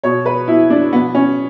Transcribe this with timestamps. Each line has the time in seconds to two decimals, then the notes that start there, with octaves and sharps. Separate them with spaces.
0.04 B2 C#5
0.26 B4
0.48 B2 E4
0.70 D4
0.92 B2 B3
1.15 C#4